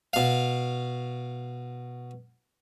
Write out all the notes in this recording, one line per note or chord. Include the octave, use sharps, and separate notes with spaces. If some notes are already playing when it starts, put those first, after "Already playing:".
B2 F5